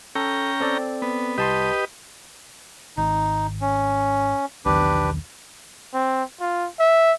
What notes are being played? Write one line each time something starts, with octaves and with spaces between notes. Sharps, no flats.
C#4 A4 G5 A#5
C4 A4 D5
B3
C2 G4 B4 D#5 A5 C6
G#1 D#4
C#4
B1 E2 D#3 D4 G4 B4
C4
F4
E5